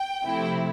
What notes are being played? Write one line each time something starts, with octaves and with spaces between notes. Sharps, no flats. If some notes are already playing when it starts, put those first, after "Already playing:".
Already playing: G5
C3 F3 A3 C4 E4